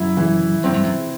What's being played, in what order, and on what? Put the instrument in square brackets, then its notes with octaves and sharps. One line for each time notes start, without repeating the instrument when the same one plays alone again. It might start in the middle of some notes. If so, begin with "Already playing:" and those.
Already playing: [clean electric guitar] F#2 [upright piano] E4
[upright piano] E3
[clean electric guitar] F#2 [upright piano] C4
[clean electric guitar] G2
F#2